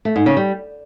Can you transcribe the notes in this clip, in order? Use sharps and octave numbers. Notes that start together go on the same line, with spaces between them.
A3
G#2
C#3
G3